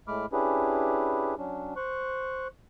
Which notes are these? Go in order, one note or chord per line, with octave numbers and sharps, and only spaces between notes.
A2 G#3 A3 B5 D6 F6
C#4 D4 E4 G4 G#4 B4
F#3 C#4 D4
C5 C#6 F#6